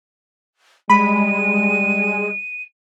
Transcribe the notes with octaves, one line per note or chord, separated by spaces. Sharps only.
G3 G#3 B5 D#7